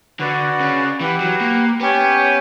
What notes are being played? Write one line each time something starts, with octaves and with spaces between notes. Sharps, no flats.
D3 F#4 B4 D5 F#5
C#3
E3 G4 B4 F#5
F#3
A#3
B3 C#4 G4 C#5 G5